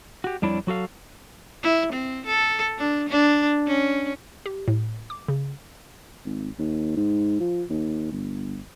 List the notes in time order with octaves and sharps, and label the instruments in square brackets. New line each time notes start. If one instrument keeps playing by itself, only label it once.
[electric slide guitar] F#4 G4
F2 G3 D4 E4 C#5 D5
F#3 F#4 A4 F5
[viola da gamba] E4
C4
A4
D4
D4
C#4
[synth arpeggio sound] G4
A2
D6
C#3
[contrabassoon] G#1
D#2
G#2
F3
D#2
G1